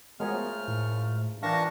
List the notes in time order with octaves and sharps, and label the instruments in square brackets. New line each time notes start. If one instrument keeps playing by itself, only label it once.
[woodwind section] F3 F#3 B3 [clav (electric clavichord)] G#3 A#4 G#5 [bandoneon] F6
[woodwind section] F#2 F3 A3
[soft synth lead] A2
[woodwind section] A#2 E3 [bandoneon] D4 A5 C#6 [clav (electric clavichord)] F5 G5 [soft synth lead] A#6